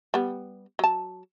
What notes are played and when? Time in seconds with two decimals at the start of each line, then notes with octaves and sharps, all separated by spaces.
0.14 G3 B3
0.79 F#3 A5